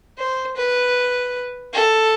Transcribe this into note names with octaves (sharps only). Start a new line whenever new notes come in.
C5
B4
A4